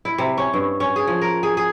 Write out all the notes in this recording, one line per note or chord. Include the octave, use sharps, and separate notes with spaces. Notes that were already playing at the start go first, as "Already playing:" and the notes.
E4
C3
C#4
G2
C#4
G#4
F3
A#4
G#4
G#4